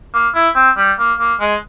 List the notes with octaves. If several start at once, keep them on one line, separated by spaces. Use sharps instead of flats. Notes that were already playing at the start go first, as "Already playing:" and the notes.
A#3
E4
C4
G3
A#3
A#3
G#3